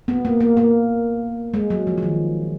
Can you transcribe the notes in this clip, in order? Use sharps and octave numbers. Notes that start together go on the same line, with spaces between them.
B3
A#3
A#3
A#3
G#3
F#3
F3
F3
D#3